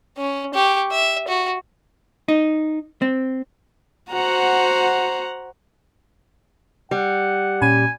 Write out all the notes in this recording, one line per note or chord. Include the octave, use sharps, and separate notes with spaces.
C#4
G4 C#6
E5
F#4
D#4
C4
F#4 C5 F#5 A#5
G3 F#5
A#2 C#4 G#5 B5